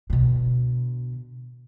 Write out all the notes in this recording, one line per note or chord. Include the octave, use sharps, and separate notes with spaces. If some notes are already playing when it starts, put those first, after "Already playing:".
B2 D3